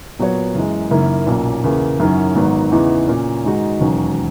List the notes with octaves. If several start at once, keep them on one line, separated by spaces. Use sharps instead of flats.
A#2 F#3 B3 F#4 C#5
F#2 E3 G#3
F#1 F#2 D#3 A#3 E4
B1 A#2 A#3 C#4
E2 C#3 E3 A#3
F#2 D#3 F#3 C#4 E4
G#1 G#2 D#3 F#3 B3
E2 C#3 E3 B3 D#4
A#2 A#3 C#4
G#2 D#3 G#3 D#4 F#4
E1 D#2 D#3 F#3 C#4